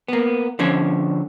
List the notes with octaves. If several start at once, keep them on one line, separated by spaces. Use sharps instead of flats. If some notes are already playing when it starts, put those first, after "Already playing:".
A#3 B3
D3 F3 C#4 C#5